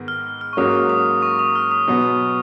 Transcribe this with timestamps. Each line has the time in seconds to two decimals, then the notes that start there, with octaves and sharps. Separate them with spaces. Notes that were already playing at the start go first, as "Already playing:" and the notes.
Already playing: G#2 D#3 G#3 B3
0.08 F6
0.41 F6
0.53 C#6
0.57 G#2 F#3 A#3 C#4 F#4 D#6
0.89 D#6
1.22 C#6
1.39 D#6
1.55 F6
1.71 D#6
1.88 B2 F#3 B3